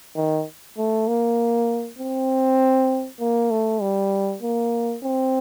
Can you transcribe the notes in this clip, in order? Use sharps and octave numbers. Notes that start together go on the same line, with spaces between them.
D#3
A3
A#3
C4
A#3
A3
G3
A#3
C4